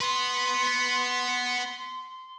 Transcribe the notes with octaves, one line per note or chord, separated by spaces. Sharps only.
B3 B4 C6